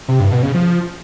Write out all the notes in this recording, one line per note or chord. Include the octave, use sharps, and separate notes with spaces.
C3
G2
B2
C#3
F3